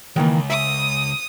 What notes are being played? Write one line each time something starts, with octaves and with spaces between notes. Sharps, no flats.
C#2 D#3 E3 A#3
E5 D#6